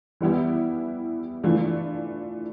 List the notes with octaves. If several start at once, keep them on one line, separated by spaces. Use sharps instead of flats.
E3 G3 B3 E4 G4
E3 A3 D4 F4